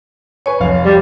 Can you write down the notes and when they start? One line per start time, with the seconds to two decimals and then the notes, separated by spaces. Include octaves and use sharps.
0.46 B4 C#5 G#5 C#6
0.60 F1 F5
0.85 G3